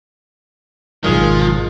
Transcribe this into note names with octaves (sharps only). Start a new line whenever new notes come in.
G#1 B2 D#3 F3 F#3 G#3